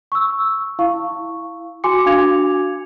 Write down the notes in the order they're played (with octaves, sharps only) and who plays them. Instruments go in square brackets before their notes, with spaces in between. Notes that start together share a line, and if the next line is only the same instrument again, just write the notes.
[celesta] C#6 E6
E4 F5 C#6
F#4 G#5 C6 D6 C#7
D4 F#4 F5 D6 G#6 F7